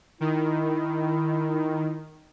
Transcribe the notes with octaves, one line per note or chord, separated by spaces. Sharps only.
D#3 E4